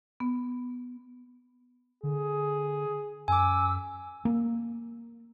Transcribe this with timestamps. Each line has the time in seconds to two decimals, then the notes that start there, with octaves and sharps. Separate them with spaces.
0.20 B3
2.03 D3 G#4
3.28 F#2 G#5 D6 E6
4.25 A#3